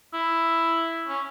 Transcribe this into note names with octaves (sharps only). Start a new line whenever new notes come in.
E4
C#4